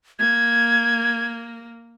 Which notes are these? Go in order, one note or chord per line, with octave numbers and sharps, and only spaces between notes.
A#3 G#6